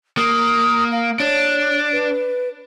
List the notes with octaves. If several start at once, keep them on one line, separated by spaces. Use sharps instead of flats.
A#3 D#6
F5
D4 C#5
B4